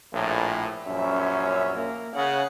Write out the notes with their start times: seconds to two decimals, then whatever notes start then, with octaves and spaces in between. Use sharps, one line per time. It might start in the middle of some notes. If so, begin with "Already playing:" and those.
0.13 A#1 A2
0.86 A#1 F#2 C#4 E5
1.77 A#3
2.15 C#3 F#5